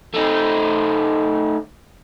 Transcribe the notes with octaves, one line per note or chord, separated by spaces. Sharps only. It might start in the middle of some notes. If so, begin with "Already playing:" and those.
A3 D#4